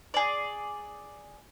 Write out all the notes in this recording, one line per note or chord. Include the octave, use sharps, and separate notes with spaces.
G#4 D5